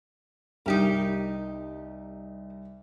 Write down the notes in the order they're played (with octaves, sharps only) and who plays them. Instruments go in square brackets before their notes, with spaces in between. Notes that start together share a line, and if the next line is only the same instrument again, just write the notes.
[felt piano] C2 [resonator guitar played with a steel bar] D#4 G4 A#4